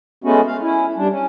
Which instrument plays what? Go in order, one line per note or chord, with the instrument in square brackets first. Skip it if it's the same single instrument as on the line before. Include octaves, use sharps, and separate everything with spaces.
[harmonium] G#3 A3 B3 C#4 F#4
F5
C#4 E4
G3 D4
C#4